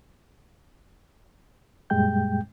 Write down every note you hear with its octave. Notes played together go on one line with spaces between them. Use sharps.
F#2 A#2 G3 G#3 G5 G6